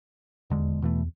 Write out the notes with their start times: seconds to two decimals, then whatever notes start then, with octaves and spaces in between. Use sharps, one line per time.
0.50 D#1 E2 D3 G#3
0.82 B2 E3 A3